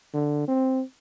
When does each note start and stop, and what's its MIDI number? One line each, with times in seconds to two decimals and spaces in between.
0.14 0.47 50
0.48 0.82 60